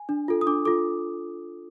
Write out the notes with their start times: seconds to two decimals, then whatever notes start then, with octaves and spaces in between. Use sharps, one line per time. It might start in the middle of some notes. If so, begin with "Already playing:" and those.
Already playing: G#5
0.09 D4
0.28 F4 A4
0.41 D#6
0.47 D4 D6
0.65 F4 A4 D6